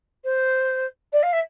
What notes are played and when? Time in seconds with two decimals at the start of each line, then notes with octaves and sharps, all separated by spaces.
0.24 C5
1.13 D5
1.23 F5
1.33 E5